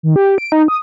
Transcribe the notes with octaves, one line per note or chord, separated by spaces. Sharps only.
D#3
G4
D7
D#4
D#6